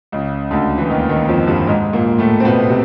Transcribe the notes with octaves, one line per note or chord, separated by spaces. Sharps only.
C#2 C#3
D2 D3
E3
D#2 D#3
D#2 D#3
F2 F3
G2 G3
G#2 G#3
A#2 A#3
A2 A3
C4
B2 B3
C3